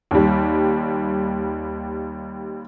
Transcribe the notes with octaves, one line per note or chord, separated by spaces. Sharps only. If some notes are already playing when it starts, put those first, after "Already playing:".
D#2 G3